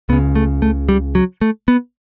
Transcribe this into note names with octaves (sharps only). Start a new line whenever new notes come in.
C#2 C#3 B3
A3
A3
G3
F#3
A3
B3